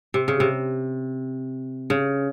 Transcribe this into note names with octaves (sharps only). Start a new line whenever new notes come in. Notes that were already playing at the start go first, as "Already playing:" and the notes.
C3
C#3
C3
C#3